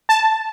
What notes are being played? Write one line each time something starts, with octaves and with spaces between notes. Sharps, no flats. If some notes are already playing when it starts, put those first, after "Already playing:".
A5